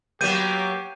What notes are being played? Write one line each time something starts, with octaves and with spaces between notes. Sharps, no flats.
F#3 A#3 B3 G4 G6 D#7